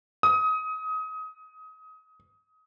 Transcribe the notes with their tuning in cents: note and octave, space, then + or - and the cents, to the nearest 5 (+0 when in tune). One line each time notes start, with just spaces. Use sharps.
D#6 +25